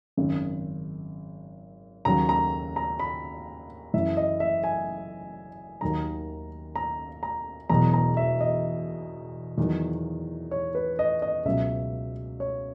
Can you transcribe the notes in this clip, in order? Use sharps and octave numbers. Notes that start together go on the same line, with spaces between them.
G#1 F#2 C#3
D#2 C#3 F#3 A#5
A#5
A#5
B5
F#1 F#2 E3 E5
D#5
E5
G#5
D#2 D#3 F#3 A#5
A#5
A#5
E1 E2 B2 F#3 A#5
A#5
E5
D#5
E2 D#3 F#3
C#5
B4
D#5
D#5
C#2 B2 F#3 E5
C#5